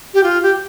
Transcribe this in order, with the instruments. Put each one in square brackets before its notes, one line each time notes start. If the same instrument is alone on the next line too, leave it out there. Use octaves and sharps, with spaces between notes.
[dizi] G4
F4
G4